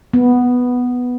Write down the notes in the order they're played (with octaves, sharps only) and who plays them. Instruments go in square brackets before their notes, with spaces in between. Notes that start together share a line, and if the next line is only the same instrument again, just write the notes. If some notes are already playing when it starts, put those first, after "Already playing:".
[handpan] B3